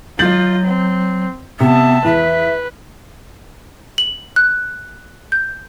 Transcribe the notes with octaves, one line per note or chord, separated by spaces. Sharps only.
F#3 F4 D#5 G6 A6 F#7
C4
C3 B3 E5 A5
E2 B4 E5
F#7
F#6
G6